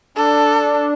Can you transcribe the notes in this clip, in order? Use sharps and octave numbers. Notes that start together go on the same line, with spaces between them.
D4 A4